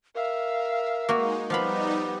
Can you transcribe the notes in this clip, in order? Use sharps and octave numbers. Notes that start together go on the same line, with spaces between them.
A#4 E5 F5
G#3 A#3 D#4 F#4
F3 G3 B3 D#4 F5 B5 D6